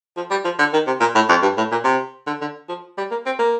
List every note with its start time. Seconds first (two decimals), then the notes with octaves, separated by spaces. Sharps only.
0.17 F3
0.31 G3
0.45 F3
0.59 D3
0.73 D#3
0.87 C3
1.00 A#2
1.15 A2
1.29 F2
1.42 G2
1.57 A2
1.72 A#2
1.85 C3
2.27 D3
2.41 D3
2.69 F3
2.98 G3
3.11 A#3
3.26 C4
3.39 A#3